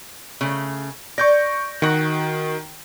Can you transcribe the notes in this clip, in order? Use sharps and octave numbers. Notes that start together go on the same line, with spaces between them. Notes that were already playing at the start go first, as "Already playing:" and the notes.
C#3 A3
D5 C#6 G6 A#6
D#3 F#4 F#5